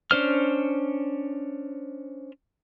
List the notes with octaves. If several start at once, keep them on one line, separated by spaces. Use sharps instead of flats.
C#4 D4 C5 F6